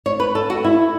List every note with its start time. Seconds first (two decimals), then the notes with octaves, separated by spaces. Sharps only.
0.06 C#5
0.20 B4
0.35 A4
0.50 F#4
0.64 E4